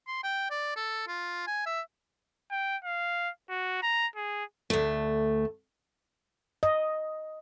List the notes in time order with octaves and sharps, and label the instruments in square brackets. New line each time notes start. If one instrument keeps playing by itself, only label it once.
[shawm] C6
G5
D5
A4
F4
G#5
E5
[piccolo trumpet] G5
F5
F#4
A#5
G#4
[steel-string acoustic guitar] D2 A3
[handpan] D#5